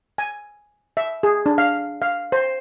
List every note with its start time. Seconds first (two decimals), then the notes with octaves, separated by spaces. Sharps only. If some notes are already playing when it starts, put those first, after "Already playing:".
0.18 G#5
0.97 E5
1.23 G#4
1.46 D4
1.58 F5
2.02 F5
2.32 C5